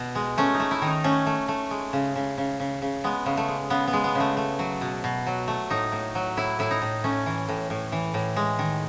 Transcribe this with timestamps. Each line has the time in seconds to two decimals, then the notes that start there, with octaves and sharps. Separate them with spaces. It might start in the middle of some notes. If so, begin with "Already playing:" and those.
Already playing: B2
0.15 G#3
0.38 A3 C#4
0.54 D#4
0.60 A3
0.71 E4
0.82 D#3
0.87 D#4
1.04 A3 C#4
1.26 A3
1.48 A3
1.71 G#3
1.93 C#3
2.16 C#3
2.38 C#3
2.60 C#3
2.82 C#3
3.04 G#3 B3
3.26 C#3
3.37 A3
3.48 G#3
3.70 C#3 B3
3.87 B3
3.93 G#3
4.04 B3
4.15 C#3
4.20 A3
4.37 A3
4.59 F#3
4.81 B2
5.04 B2
5.27 F#3
5.48 A3
5.70 A2 D#4
5.92 A2
6.15 F#3
6.37 A2 E4
6.59 A2 E4
6.71 D#4
6.82 A2
7.04 A3 C#4
7.26 E3
7.49 A2
7.70 A2
7.92 E3
8.14 A2
8.36 G#3
8.59 D#3